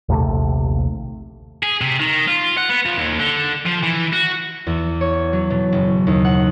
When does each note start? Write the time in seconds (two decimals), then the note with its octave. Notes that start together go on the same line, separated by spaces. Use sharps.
0.09 A#1 D#2 C3 A3
1.63 G#4
1.82 C3
2.00 D#3
2.28 F4
2.57 F#5
2.69 B3
2.86 F3
2.98 D#2
3.19 D3
3.66 F3
3.83 E3
4.13 F#4
4.67 E2
5.01 C#5
5.33 F#3
5.50 B2
5.72 F#1
6.07 D#2
6.25 F#5